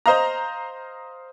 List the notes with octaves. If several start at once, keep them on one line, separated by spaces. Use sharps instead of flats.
C5 D#5 F5 A#5